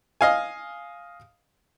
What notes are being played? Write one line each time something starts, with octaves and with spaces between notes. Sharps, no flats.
D#5 F5 G#5